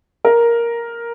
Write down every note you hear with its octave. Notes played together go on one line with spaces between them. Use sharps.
A#4